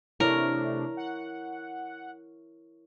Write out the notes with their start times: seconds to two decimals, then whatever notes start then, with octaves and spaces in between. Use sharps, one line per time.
0.20 C3 A3 D4 E4 A#4 C#5
0.97 F#5